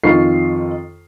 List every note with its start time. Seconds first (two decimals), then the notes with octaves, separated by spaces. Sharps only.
0.03 F2 D#3 F4 C#6 C7